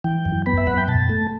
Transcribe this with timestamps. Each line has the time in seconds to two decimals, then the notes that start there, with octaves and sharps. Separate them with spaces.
0.04 E3 G5
0.25 F#2
0.46 B3 B5
0.58 E5
0.67 F#2 F#5
0.78 G5
0.88 B2 A5
1.09 A3